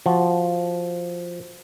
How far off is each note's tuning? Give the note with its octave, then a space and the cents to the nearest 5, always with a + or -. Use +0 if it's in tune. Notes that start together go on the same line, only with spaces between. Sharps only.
F3 +0 F#4 +0